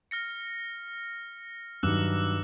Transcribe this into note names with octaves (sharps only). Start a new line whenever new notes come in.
F6 A#6 C#7
G2 D#3 F#3 D6 E6 F#6